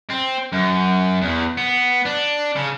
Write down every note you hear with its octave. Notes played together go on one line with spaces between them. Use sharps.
C4
F#2
E2
B3
D4
C#3